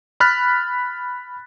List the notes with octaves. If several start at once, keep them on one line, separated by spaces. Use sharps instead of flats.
B5 F6 F#6 A6 B6